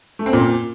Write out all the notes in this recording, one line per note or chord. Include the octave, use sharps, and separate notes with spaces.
A3
C4
A#2